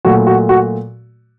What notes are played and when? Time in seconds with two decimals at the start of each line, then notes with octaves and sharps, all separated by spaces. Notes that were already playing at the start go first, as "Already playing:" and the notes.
0.05 A#2 F#3 A3 F#4
0.27 F#4
0.49 F#4